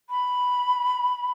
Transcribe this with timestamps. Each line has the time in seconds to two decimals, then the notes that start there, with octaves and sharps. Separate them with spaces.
0.10 B5